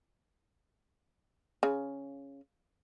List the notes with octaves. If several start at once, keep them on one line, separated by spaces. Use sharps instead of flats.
C#3